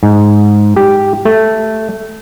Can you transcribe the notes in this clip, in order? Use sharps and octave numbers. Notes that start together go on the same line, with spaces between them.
G#2
G4
A3